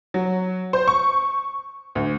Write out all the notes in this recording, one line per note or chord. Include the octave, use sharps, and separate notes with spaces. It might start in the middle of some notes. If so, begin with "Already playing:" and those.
F#3
C5
C#6
D2